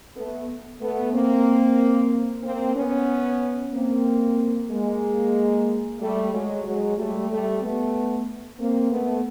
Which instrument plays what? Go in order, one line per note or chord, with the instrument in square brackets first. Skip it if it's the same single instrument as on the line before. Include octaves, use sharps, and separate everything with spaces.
[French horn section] A3 B3
A3 B3
A#3 C4
A#3 C4
B3 C#4
A#3 C4
G#3 A#3
G3 A3
F#3 G#3
F#3 G#3
G3 A3
G3 A3
A3 B3
A#3 C4
A3 B3